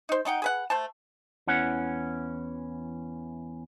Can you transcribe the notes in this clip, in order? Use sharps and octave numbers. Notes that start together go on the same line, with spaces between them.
D#4 C5
A3 D#4 F#5 G5
G#4 B4 F#5
A3 C5 A5
E2 E3 C#4 F#5